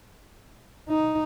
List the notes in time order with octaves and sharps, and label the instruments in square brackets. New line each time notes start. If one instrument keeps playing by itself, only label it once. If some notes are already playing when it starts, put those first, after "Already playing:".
[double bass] D#4